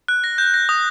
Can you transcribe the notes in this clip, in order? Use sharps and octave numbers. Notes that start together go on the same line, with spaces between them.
F#6
A#6
G6
A#6
D#6